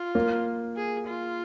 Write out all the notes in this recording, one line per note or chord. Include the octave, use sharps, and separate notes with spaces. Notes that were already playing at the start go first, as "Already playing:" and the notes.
Already playing: F4
A#3
G#4
F4